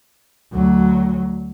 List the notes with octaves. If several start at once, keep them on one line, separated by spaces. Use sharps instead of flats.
D2 F#3